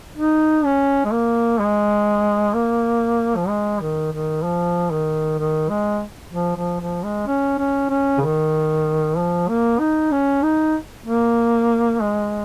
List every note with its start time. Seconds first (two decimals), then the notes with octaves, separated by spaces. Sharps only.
0.17 D#4
0.65 C#4
1.05 G#3
1.12 A#3
1.59 G#3
2.54 A#3
3.36 F3
3.48 G#3
3.81 D#3
4.12 D#3
4.43 F3
4.91 D#3
5.38 D#3
5.69 G#3
6.33 F3
6.56 F3
6.80 F3
7.03 G#3
7.27 C#4
7.58 C#4
7.90 C#4
8.18 C#3
8.21 D#3
9.17 F3
9.49 A#3
9.79 D#4
10.12 C#4
10.43 D#4
11.06 A#3
12.01 G#3